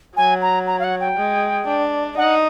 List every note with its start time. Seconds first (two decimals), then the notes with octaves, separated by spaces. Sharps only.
0.17 F#3 G#5
0.42 A#5
0.67 A#5
0.79 F5
0.84 F#5
1.00 G5
1.17 G#3
1.67 D4
2.17 D#4 F#5